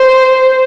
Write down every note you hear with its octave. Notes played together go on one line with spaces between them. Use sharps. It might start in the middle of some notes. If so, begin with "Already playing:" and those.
Already playing: C5